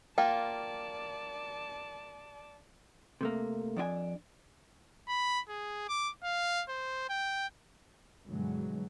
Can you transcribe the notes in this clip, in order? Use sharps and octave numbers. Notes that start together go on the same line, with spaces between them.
A#3 F4 D5 G5 A5
C3 A3 A#3
F2 D4 F4 G#5
B5
G#4
D6
F5
C5
G5
G2 B2 D3 E3 F#3 G#3